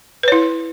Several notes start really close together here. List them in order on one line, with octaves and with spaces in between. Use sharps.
B4 C#5 E4